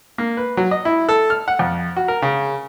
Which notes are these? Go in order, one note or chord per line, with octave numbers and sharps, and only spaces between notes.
A#3
B4
F#3
D#5
E4
A4
F6
F#5
F2
F#4
A#4
C#3